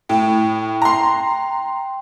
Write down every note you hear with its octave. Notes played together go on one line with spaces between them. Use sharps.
A2 G5
A#5 C6